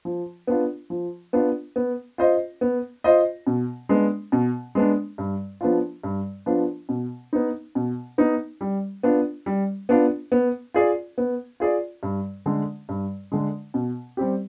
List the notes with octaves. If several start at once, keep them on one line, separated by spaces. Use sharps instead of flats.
F3
B3 D4 F4
F3
B3 D4 F4
B3
F4 C5 D#5
B3
F4 C5 D#5
B2
G#3 B3 D4
B2
G#3 B3 D4
G2
F3 B3 D4 F4
G2
F3 B3 D4 F4
B2
B3 D#4
B2
B3 D#4
G3
B3 D4 F4
G3
B3 D4 F4
B3
F4 G#4 D5
B3
F4 G#4 D5
G2
D3 G#3
G2
D3 G#3
B2
G3 C4 G4